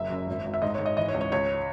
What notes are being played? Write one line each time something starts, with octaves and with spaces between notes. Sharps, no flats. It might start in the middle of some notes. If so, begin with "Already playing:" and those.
Already playing: F#1 E5
F#2
G#1
G#1
E5
G#2 D#5
C#5
G#2
D#5
E3 D#5
C#5
C#2
C#5
C#2 C#5